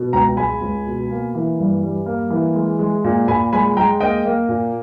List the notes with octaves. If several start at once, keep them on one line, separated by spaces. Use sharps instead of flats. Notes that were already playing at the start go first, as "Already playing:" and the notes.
Already playing: B2
C#2 G5 A#5
G#3 G#5 B5
C#2
B2
A#3
E3
G2
G3
A#3
E3
G#3
G#3
A#2
A#2 G#5 B5
G#3 G#5 B5
G#3 G5 A#5
A#3 D#5 G5
A#3
A#2